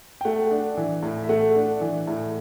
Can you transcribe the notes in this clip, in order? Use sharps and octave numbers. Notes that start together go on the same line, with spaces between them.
G5
A3 F#5
D4
E3
A2
E5
A3 F#5
D4
E3
A2